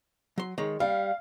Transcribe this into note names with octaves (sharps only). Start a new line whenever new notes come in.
F#3 C6
D#3 G#3 C#5
G3 F5